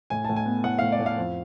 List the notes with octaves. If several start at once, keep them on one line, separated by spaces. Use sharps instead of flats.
A2 G#5
A2 A5
G#5
B3
A2 F#5
A2 F5
D5
A2
F5
F2